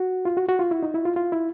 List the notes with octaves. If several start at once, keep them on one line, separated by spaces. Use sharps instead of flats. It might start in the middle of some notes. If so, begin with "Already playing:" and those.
Already playing: F#4
F4
F#4
F#4
F4
E4
D#4
E4
F4
F4
E4